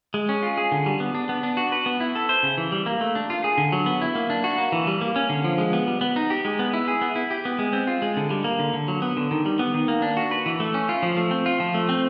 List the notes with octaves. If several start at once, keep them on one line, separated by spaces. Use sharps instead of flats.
G#3
C#4
F4
G#4
D3
G3
B3
D4
B3
D4
F#4
B4
B3
E4
A4
C5
C#3
E3
G3
A#3
A3
D4
F4
G#4
D3
F#3
B3
E4
A#3
D4
F#4
A#3
E3
G3
A#3
C#4
D3
F3
G#3
B3
G3
B3
D#4
G4
G#3
B3
E4
G#4
B3
E4
G4
B3
G#3
C4
F4
G#3
D3
G3
A#3
D3
D3
F#3
B3
D3
D#3
G3
B3
D#3
A#3
D4
F#4
B4
E3
A3
C#4
F4
F3
A3
C4
F4
F3
A3
C4